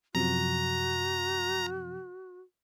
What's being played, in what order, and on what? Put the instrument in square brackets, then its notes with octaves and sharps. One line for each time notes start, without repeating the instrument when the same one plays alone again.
[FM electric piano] F#2 C3 F3 [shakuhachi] F#4 [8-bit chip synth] A#5